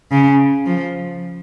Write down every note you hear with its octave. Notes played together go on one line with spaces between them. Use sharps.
C#3
F3